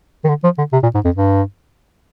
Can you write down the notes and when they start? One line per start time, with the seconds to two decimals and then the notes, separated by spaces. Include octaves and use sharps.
0.24 D#3
0.29 D3
0.44 F3
0.58 D3
0.73 C3
0.83 A#2
0.94 G#2
1.05 F2
1.16 G2